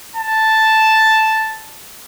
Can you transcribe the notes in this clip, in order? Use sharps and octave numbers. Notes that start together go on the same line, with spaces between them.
A5